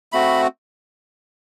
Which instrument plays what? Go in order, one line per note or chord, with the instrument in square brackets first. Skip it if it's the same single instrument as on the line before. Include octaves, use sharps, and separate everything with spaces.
[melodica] A3 C4 F#4 B5